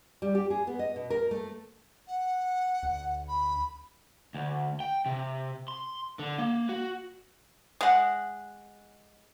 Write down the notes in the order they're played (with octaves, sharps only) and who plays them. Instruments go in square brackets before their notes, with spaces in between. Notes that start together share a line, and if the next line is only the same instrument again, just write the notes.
[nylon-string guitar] G3
G4
G#4
B3
D#5
B2
A#4
A3
[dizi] F#5
[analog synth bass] D2
[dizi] B5
[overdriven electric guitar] D2
G5
C3
C6
D3
A#3
F#4
[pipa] G#3 F#5